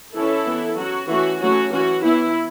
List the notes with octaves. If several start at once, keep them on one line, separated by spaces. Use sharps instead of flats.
E3 C#4 E4 A4
E3 B3
F#3 C#4 F#4
E3 A3 C#4 F#4
F#3 A3 C#4 F#4
E3 C#4 F#4
E3 B3 E4